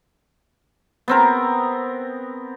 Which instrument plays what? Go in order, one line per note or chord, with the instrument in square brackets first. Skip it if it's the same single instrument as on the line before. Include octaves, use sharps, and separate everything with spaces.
[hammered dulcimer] B3 C4 A#4